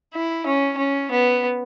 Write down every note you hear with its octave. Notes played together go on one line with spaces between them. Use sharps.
E4
C#4
C#4
B3